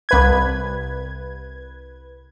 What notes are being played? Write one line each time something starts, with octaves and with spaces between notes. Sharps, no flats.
C2 B4 G#6